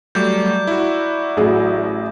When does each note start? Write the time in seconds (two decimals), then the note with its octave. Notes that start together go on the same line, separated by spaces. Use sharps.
0.15 F#3 G3 A3 D5 A#5 D6 G6
0.67 E4 F#4
1.37 A1 F#3 G#4